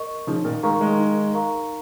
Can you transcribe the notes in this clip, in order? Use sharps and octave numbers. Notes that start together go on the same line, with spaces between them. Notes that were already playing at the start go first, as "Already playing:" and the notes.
Already playing: A#4 D#5 C#6
C#3 F3 D#4
A#2 D#3
D#3 G#3 A#4 F5 A#5 C#6
D#3 G#3
D#4
A#4 F5 A#5 C#6